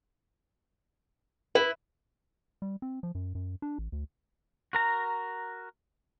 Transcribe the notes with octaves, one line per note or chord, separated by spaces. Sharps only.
E4 B4
G3
C4
F3
F#2
F#2
D4
A1
D2
F#4 A#4 A#5